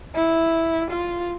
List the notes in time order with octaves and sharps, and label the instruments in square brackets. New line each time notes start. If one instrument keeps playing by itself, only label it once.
[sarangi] E4
F4